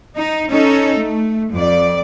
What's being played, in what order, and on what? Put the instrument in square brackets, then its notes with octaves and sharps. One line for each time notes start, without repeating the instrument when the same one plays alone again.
[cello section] D#4
C#4 D#4 A4
A3
F2 D5